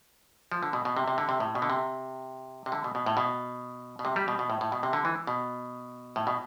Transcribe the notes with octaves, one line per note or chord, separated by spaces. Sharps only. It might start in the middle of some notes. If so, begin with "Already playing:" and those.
F3
D3
B2
B2
C3
C3
D3
C3
A2
B2
D3
C3
C3
D3
B2
B2
A2
B2
B2
C3
G3
B2
B2
A2
A2
B2
C3
D3
E3
B2
A2
B2